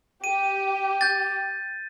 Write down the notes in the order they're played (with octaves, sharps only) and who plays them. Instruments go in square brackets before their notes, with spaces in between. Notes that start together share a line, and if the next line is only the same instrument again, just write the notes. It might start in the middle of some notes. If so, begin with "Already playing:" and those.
[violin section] G4 [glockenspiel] D#7
[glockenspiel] G6 A6